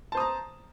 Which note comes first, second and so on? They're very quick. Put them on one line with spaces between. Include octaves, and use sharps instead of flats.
A5 C5 D#6 A#5